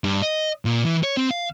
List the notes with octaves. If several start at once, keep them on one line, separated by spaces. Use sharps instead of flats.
G2
D#5
A#2
E3
C#5
C4
F5